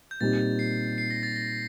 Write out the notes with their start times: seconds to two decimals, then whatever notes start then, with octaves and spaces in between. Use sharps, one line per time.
0.11 G6
0.21 A#2 G3 C4 D#4 G4 A6
0.59 C7
0.98 C7
1.11 A#6
1.23 A6
1.36 A#6